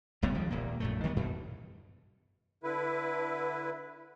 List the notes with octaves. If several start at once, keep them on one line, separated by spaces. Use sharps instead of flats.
C2 C3 G3 B3
C#2 D#3 F3 G3
D#1 A#2 A#3
A#1 F#2 A3
D#3 G3 A3 B3
F#2 B2
D3 E4 B4